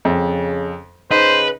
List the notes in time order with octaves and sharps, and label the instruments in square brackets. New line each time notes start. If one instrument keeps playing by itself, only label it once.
[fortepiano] F2 [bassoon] C#3
[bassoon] C#3 [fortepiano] D#4 [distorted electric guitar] B4 [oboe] C5